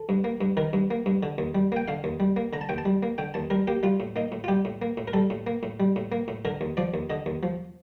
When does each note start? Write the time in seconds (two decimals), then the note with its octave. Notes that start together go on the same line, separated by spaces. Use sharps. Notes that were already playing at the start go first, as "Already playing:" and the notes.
Already playing: A4
0.09 G2
0.24 A#3
0.41 G2
0.57 D#3 A#4
0.73 G2
0.91 A#3
1.06 G2
1.23 D3
1.38 D#2
1.55 G3
1.72 A#3 G5
1.88 D3 F5
2.04 D#2
2.20 G3
2.36 A#3
2.53 D3 A#5
2.61 A5
2.69 D#2 G5
2.78 A5
2.85 G3
3.03 A#3
3.18 D3 G5
3.34 D#2 A5
3.50 G3 A#4
3.68 A#3 G4
3.83 G3 F4
4.00 A2
4.16 A#3 D#4
4.32 A2
4.44 F4
4.48 G3 G4
4.65 A2
4.82 A#3
4.97 A2
5.08 A#4
5.13 G3 A4
5.30 A2
5.47 A#3
5.63 A2
5.80 G3
5.96 A2
6.12 A#3
6.28 A2
6.45 D3 A#4
6.61 D#2
6.77 F3 D5
6.94 D#2
7.10 D3 D#5
7.26 D#2
7.43 F3